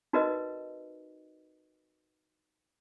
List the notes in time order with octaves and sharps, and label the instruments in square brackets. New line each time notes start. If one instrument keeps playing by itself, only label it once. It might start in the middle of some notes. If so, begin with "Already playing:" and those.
[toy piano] D#4 F#4 A#4 B4 D5 D#5